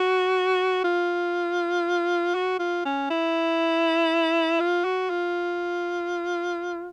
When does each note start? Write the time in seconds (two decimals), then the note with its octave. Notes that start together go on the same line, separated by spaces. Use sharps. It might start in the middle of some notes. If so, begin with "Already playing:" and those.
Already playing: F#4
0.84 F4
2.35 F#4
2.59 F4
2.85 C#4
3.10 E4
4.60 F4
4.85 F#4
5.10 F4